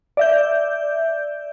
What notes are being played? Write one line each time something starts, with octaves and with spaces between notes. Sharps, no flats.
D5 E5 G6